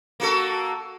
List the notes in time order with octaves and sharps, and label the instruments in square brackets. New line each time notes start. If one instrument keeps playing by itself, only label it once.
[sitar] A#3 F#4 A4